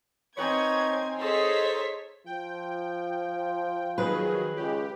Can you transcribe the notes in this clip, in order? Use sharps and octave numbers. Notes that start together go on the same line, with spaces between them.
C4 D#4 B4 C#5 G#5 G#6
D#4 G#4 A4 C5 C#5 D#5 B6
F3 G5
D#3 F#3 G#4 B4
C#2 G4